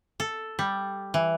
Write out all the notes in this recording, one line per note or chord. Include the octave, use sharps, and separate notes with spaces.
A4
G3
E3